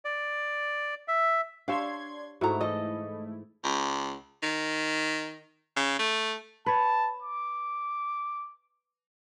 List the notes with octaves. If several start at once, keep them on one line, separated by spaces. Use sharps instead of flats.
D5
E5
D4 G4 C#5 E5 F5 C6 G#6
G#2 A3 E4 F#4 A#5
E3 A4 D#5
C#2
D#3
C#3
A3
B4 C#5 A5
D6